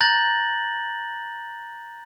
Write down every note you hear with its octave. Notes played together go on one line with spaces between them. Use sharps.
A#5 F#6 G6 A6 A#6 F#7